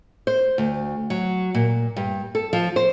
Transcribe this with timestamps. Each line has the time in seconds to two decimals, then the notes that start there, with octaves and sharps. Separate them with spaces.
0.27 C5
0.58 D2
1.10 F#3
1.54 A#2
1.97 G2
2.35 A4
2.53 F3
2.76 C5